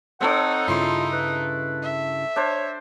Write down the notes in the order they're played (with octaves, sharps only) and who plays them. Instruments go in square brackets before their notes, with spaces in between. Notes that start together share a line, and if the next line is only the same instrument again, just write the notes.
[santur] C4 A4 C#5 [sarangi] D#4 [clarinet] F#5
[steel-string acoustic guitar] G2 C#3 E4 [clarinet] F4 [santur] C6 C#6
[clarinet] B4
[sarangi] E5
[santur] D4 C5 [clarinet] C#5